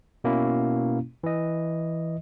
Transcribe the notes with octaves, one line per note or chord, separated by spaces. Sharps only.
B2 A#3 C#4 E4
E3 D#5